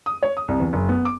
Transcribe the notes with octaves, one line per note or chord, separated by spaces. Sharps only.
D#6
C#5
D#6
C2
E2
F#1
B3
D6